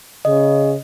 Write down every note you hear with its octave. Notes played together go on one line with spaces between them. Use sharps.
C#3 D#5